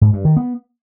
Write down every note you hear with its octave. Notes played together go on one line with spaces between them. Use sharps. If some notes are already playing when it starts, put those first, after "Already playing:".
G#2
G2
D#3
B3